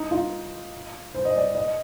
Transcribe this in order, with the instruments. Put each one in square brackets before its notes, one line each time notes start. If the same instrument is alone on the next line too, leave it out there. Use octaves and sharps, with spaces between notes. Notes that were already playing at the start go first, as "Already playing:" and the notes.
Already playing: [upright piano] D#4
F4
C5
D#5
D5
D#5